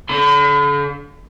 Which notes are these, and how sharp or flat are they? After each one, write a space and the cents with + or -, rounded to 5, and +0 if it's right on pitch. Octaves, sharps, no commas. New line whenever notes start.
D3 -45 B5 +40